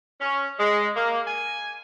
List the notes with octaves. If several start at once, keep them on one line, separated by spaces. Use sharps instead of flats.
C#4
G#3
A#3
G#5